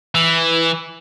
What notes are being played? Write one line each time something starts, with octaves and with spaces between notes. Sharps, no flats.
E3